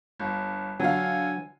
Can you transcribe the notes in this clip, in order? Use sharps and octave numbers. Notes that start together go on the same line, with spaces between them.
G1
D3 F#3 F5 G#5